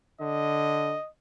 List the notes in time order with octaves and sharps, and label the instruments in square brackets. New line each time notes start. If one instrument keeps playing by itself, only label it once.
[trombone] D3 [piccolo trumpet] D#5